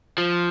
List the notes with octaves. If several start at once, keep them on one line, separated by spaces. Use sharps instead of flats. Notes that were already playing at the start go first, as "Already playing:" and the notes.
F3